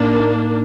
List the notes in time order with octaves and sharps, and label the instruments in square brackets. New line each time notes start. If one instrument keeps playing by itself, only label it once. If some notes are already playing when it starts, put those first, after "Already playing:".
Already playing: [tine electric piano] A2 D#4 [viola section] A#3 D4
[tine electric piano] D#4